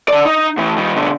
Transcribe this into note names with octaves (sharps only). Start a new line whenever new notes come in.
D3 D5
D#4
A2 E3
D#3 G3
B2 D3